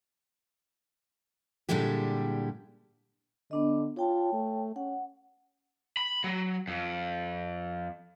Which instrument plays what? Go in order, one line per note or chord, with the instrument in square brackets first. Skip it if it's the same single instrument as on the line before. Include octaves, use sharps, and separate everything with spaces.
[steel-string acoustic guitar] A#2 D3 G3 G#3 E4 G4
[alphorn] D3 [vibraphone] B3 D4 D#5
[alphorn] F4 [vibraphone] C#5 G5 A5
[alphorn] A3
[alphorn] C#4 [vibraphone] F#5
[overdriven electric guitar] B5
F#3
F2